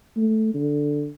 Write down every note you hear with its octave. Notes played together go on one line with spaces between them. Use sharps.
A3
D3